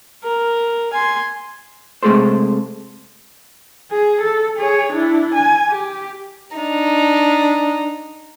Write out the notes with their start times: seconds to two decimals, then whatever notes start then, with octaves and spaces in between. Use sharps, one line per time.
0.24 A#4
0.93 G#5 C6
2.03 C3 G#3 A3 G#4 A4 C5
3.91 G#4
4.22 A4
4.57 G#4 C#5
4.92 D4 E4
5.34 G#5
5.69 G4
6.57 D4 D#4